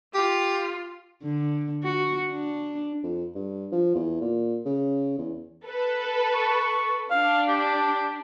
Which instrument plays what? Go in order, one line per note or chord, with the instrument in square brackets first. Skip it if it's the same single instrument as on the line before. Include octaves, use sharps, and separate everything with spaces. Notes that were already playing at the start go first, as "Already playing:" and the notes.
[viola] F4 [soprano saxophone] G4
[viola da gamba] D3
F#4
D4
[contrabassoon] F2
G2
F3
E2
A#2
C#3
E2
[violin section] A4 B4
[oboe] C#6
[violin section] D4 [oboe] F5
[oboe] G4